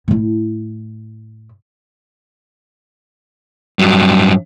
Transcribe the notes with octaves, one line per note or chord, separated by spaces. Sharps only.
A2 E4
G2 F#3